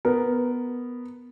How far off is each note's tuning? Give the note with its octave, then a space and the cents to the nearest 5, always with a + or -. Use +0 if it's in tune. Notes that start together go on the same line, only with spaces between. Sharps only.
B3 +0 A#4 +0